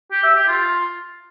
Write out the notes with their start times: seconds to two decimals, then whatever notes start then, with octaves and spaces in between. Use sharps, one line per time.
0.12 G4
0.24 E5
0.36 G4
0.48 F4